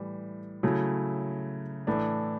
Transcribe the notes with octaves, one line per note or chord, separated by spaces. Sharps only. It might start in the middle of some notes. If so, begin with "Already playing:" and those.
Already playing: A2 E3 G3
C#3 F#3 A3 E4
A2 E3 A3 D4